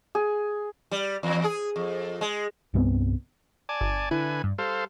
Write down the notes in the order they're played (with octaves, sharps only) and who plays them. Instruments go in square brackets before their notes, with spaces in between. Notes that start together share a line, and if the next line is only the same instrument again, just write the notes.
[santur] G#4
[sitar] G3
E2
G#4
F2
G#3
[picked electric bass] C2 G2 B3 C4
[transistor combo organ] D5 G#5 A5
[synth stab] G1
[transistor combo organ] D3 B4 G#5 [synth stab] E4
[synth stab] G2
[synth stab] G3 [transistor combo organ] A4 C5 F5